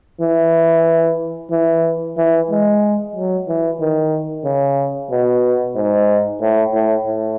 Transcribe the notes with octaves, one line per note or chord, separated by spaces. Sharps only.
E3
E3
E3
G#3
F#3
E3
D#3
C#3
B2
G#2
A2
A2
A2